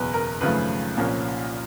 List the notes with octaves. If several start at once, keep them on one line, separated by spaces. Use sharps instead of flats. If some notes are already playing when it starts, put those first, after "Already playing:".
Already playing: F#1 E2 B2 B4
A#4
G#1 F#2 C#3 F3 A3 B4
C2 A#2 F3 A#3 C#4